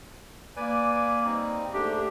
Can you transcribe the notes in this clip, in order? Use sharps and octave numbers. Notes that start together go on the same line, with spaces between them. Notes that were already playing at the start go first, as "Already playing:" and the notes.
A#3 B4 D5 G#5
G3 C4 D#4
G#2 A3 D4 G4